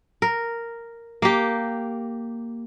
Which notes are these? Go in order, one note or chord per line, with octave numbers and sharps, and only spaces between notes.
A#4
A#3 G4